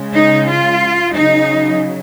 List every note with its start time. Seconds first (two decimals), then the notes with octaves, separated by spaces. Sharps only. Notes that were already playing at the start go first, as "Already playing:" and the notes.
Already playing: C#3 G#3
0.16 D#4
0.49 F4
1.14 C#3 F#3 D#4